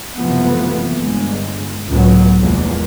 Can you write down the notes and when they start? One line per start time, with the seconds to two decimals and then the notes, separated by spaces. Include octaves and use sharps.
0.15 F#1 C3 E3 F3 A3 B3
0.99 G1 G#3
1.89 C#2 F#2 A2 F#3 B3
2.40 F1 E2 E3 F3 G#3 A#3